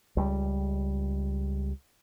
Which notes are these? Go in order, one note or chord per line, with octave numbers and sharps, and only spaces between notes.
C#2 G3